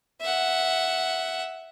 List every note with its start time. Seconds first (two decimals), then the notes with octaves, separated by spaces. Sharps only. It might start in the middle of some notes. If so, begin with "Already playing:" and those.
0.21 E5 F#5